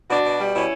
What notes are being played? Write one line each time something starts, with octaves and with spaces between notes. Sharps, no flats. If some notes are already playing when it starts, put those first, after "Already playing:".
B2 D4 F#4
B2
G3
B2 C#4 E4